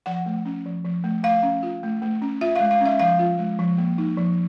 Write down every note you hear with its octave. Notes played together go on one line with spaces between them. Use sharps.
F3 F#5
A3
C#4
F3
F3
A3
A3 F5
C#4
F4
A3
A3
C#4
F4 E5
G#3 F5
F5
C#4 E5
F3 F5
F4
G#3
F3
A#3
D#4
F3